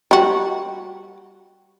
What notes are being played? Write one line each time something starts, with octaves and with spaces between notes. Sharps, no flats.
G3 F#4